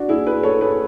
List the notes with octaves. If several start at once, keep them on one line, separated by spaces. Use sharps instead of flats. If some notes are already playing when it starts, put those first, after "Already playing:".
Already playing: D4 F#4
E4 G#4
G#4 B4
A4 C#5
G#4 B4